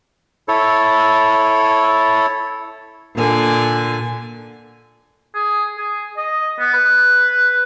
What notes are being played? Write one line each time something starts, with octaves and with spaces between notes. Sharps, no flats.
E4 A4 C#5
A#2 D3 G#5
G#4
G#4
D#5
B3
B4